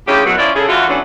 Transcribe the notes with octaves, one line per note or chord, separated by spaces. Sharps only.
D2 C#3 E4 G4
F#2 B2 E3 F#3
F3 C#4 E4 F4 D5
C#3 G#4 A4
D3 E3 A3 F4 F#4
E3 F#3 A3 B3 C#4 D4